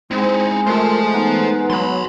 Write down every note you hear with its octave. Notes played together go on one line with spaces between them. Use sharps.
G#3 C4 D#4 E4
A3 F4 A#4 C5 A5
B3 D#4 B4
F#3 B5 C6